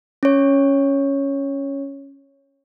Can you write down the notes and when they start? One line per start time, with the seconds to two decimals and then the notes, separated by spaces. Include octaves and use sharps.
0.23 C#4 C#5